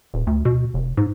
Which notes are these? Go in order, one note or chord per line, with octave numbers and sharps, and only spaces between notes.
D#1
D2
B2
F1
G#2